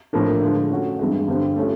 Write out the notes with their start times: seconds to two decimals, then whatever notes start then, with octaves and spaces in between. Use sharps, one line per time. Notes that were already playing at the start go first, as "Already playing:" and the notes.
0.13 A2 F3 A#3 D4
0.41 D3 F3 G#3
0.71 A3 C#4 F#4
0.99 G2 E3 G#3
1.28 G2 D3 G3 C4
1.56 A3 C#4 F4